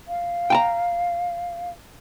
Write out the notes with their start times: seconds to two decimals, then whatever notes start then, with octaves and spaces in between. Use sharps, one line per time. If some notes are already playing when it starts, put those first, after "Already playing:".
0.08 F5
0.50 G5 A5 A#5